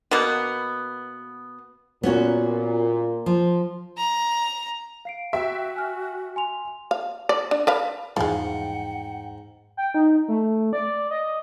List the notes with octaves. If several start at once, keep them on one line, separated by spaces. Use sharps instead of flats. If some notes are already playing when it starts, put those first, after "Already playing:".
B2 A#3 B3
A#2 B3 C#4 F#4
F3
A#5
F5 C7 D7
F#4 E5 G5
G#5 F6
G#5 C6 F7
F5
D5
D4
A#4 B4 F5
E2 G#2 E3 F3 G3 G#3 F#5 G5
G5
D#4
A3
D5
D#5